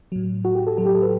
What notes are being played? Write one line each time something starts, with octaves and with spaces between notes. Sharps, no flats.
A2 F#3
F#4
G4
A4
A2 F#3 A4
G4
A4
B4